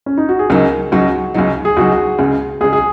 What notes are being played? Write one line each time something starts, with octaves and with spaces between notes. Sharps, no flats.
C#4
D#4
F#4
G#4
C#2 C#3 F#3 D#4 A#4
C#2 C#3 F#3 D#4 F#4
C#2 C#3 F#3 D#4
G#4
C#2 C#3 F#3 D#4 F#4
C#2 C#3 G#3
C#2 C#3 G#3 G#4
G#4